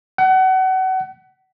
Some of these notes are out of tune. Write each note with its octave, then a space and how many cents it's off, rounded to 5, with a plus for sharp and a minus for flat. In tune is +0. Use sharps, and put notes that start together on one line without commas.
F#5 +30